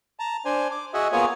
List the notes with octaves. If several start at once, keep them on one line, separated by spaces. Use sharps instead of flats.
A5 A#5
D4 C5 G#5
D6
F#4 G#4 D#5 E5 F#5 G#5
A#3 B3 F4 G#4 C#5 G#5